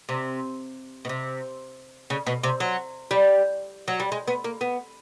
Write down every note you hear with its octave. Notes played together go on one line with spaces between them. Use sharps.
C3
B2
C3
C#3
B2
C3
F#3
G3
F#3
G3
G#3
B3
A#3
B3